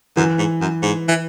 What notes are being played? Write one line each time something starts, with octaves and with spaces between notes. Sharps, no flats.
F#2 E3
G#2
F#2
G#2
E3